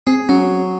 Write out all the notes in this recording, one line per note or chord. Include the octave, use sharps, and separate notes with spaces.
C4 G#4
F#3 C#4